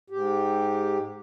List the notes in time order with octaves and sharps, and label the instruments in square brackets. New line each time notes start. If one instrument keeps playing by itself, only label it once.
[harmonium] G#2 G4